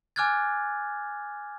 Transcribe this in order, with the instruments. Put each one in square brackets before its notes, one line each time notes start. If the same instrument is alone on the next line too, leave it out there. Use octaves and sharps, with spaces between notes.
[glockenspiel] G#5 D6 F6 F#6 G#6 A6